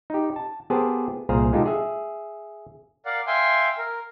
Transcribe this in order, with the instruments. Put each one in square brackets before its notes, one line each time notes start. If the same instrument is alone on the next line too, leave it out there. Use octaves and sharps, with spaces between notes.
[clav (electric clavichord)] D#4 G4
A5
B3 G4 G#4 A#4 C5 A5
C2 A#2 G#4 C5 F5 A#5
G#3 D#4 F4 G4 A4
G#4 E5
[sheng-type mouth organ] A#4 D5 F5 F#5
E5 F5 G5 G#5 C6
A#4